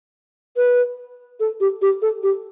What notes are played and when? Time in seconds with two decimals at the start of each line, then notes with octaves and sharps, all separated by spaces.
0.57 B4
1.40 A4
1.61 G4
1.82 G4
2.02 A4
2.23 G4